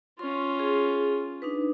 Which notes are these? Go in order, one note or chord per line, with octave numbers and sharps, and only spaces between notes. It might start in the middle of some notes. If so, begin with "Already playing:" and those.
C#4 F4 C6
G#4
D4 D#4 B4